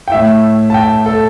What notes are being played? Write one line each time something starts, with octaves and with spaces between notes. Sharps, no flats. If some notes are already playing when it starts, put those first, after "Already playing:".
G5
A2 A3 E4 E5
A5
G5
A4